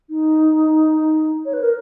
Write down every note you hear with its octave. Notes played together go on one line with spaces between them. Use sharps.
D#4
C#5
B4
A#4